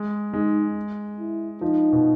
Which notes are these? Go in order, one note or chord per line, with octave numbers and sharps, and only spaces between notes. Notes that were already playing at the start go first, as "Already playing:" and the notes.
Already playing: G#3
G#3 D#4
E4
F3 D#4
B2